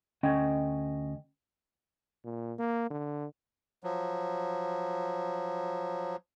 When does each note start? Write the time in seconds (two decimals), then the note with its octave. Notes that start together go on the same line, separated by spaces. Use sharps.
0.23 D2 C#4 D#5 G5
2.24 A#2
2.59 A#3
2.90 D3
3.84 F3 F#3